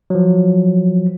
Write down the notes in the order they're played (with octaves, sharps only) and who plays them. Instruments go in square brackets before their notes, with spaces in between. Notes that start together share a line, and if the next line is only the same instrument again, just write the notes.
[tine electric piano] F3 F#3